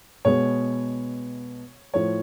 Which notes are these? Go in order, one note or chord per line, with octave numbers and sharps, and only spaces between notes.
B2 G#3 B3 C#5
A2 F3 A3 C#5